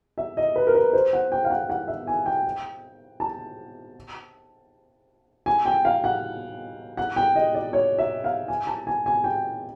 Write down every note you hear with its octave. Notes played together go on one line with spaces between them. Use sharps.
E5
D#5
B4
A#4
B4
C5
F#5
G5
F5
F#5
F#5
E5
G#5
G5
A5
G#5
G5
F5
F#5
F#5
G5
D#5
D5
C#5
E5
F5
G#5
A5
G#5
G#5
G5